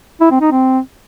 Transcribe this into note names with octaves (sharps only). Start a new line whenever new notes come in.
E4
C4
D#4
C4